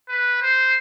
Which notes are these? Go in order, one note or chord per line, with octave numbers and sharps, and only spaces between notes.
B4
C5